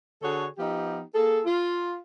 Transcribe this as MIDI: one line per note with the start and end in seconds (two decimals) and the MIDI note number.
0.22 0.46 50
0.22 0.46 66
0.22 0.46 68
0.22 0.46 69
0.22 0.46 73
0.58 1.00 53
0.58 1.00 59
0.58 1.00 63
0.58 1.00 67
1.14 1.40 58
1.14 1.40 68
1.14 1.40 69
1.45 1.98 65